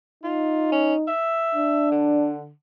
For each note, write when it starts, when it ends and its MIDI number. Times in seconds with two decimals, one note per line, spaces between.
0.24 1.10 63
0.24 0.70 65
0.72 0.94 61
1.08 1.88 76
1.55 2.37 62
1.91 2.51 50